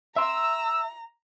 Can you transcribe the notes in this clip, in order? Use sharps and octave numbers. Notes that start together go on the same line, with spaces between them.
E5 A#5 C6 E6